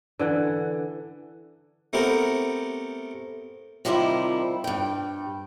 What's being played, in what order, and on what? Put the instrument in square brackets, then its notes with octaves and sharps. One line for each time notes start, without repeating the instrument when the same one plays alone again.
[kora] D3 E3 F#5
[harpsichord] A3 B3 C4 E4 G4 A#4
[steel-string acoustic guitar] C3 D#3 F3 G3 E4 C5
G2 G5